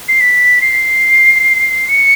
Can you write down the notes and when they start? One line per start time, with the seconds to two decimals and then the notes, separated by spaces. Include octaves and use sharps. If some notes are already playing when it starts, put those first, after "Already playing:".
0.08 C7
0.20 B6
0.61 C7
1.89 C#7